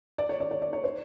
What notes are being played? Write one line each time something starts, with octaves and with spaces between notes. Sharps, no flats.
D5
C#5
D5
C#5
D5
C#5
C5